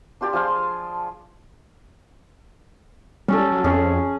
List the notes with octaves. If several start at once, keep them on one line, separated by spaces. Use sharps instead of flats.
D4 F4 G4 D5
F3 G#4 F5 C6
G3 C#4 A4
F#3
F2 C#4 G#4